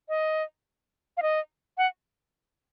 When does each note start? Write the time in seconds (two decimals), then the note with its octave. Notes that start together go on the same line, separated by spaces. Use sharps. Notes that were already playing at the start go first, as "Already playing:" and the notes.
0.09 D#5
1.17 F5
1.22 D#5
1.78 F#5